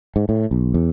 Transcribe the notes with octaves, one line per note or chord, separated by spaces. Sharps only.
G#2
A2
B1
E2